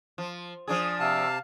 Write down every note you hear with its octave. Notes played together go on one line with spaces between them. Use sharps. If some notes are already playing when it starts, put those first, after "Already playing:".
F3
F3 D4 G#4 D#6
C3 E5 F5 G5 A5 E6